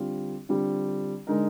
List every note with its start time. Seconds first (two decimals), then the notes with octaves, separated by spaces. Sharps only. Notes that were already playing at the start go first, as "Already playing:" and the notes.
Already playing: D3 G3 C4 F4
0.49 D3 G3 C4 F4
1.27 D3 G#3 D#4 A#4